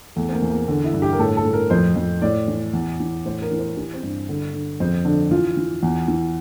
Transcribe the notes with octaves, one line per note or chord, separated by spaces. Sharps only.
E2 A3
C4
A#3
E2
A#3
D3
E4
G2
G4
A#4
A2 A4
A4
A2
A#4
F2 C5
F2
A2 D5
E3
E2
E3
A2 C5
A#4
E3
C5
E3 G4
C4
G2
D3
D3
F2 C4
D3 D4
E3 F4
E3
E2
E3